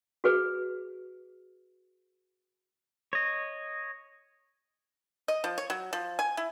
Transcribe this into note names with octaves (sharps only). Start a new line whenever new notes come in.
F#4 G#4 B4
C#5 D#5
D#5
F3
C#5
F#3
F3
G#5
E4